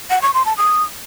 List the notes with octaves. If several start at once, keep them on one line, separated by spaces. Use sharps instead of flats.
F#5
C#6
C6
A5
D#6